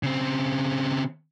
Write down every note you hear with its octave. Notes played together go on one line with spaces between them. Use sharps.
C#3 C4